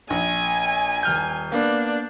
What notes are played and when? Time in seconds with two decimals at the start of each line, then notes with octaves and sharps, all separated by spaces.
0.10 A#1 G#5
1.03 D#1 F6 G6
1.52 A#3 B3 D4